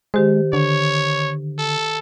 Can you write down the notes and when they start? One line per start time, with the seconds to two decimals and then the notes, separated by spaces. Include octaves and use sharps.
0.14 D#3 G#3 G4 C5
0.53 D3 C#5
1.59 A4